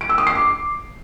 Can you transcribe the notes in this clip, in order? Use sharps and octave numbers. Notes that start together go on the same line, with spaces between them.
D7
E6
D#6
C7
D6